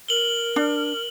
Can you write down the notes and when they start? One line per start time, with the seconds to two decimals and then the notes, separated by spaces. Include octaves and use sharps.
0.08 A#4 F#7 G7
0.56 D4